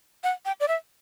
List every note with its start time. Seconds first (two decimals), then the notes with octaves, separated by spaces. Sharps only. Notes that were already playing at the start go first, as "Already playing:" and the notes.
0.24 F#5
0.45 G5
0.60 D5
0.68 E5